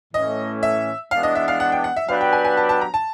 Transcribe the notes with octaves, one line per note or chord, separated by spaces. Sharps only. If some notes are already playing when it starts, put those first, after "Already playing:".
A2 E3 A3 C#4 D#5
E5
E3 G#3 B3 D4 F5
D#5
E5
F5
F#5
G5
F#5
E5
F#3 B3 D4 G4 B4 F5
G5
G#5
G#5
A5
A5
A#5
A5